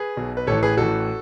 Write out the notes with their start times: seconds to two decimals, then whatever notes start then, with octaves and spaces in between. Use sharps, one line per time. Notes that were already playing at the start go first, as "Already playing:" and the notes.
Already playing: G#4 B4
0.17 B1 B2
0.37 B4
0.47 A1 A2 E3 A4 C#5
0.63 G#4 B4
0.77 A1 A2 E3 F#4 A4